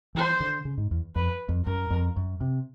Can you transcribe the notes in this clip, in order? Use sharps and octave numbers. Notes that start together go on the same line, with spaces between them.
E3 C5
D3
C#3
G#2
E2
F2 B4
F2
F#2 A#4
F2
F#2
C3